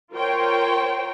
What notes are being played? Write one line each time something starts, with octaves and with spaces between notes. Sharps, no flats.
F4 A#4 C5 C#5 G5